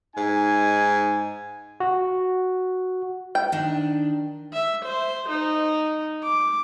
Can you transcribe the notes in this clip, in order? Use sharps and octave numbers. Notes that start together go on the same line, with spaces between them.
G#2 D#4 G#5
F#4
G5
D#3 D4
E5
C5
D#4
D6